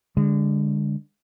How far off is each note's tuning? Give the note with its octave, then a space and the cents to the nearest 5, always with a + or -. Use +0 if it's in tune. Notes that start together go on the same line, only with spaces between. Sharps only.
D3 -10 G#3 -30